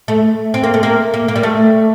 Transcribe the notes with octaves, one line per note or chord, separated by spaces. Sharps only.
A3
C4
A#3
A3
A#3
A#3
A#3
G3
A3